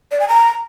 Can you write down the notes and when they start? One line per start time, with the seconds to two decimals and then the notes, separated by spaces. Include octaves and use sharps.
0.11 D5
0.20 G#5
0.29 A#5